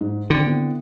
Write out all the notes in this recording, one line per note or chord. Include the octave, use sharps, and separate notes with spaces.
G#2
D3 D#3 C4
B3 C4 E4